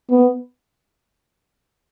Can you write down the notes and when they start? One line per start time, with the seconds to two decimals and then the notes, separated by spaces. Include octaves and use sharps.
0.10 B3